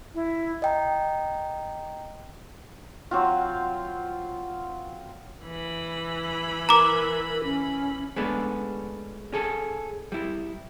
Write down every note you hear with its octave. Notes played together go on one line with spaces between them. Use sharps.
E4
D#5 G5 A#5
F#3 C4 F4
E3 B5
A#4 A#5 D6
C#4
G#3 A3 B3 C#4 D4
C#4 G#4 A4
G3 E4